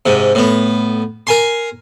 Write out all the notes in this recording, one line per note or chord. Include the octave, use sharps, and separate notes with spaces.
G#2 C3
A2 B3
A#4 G#5 C6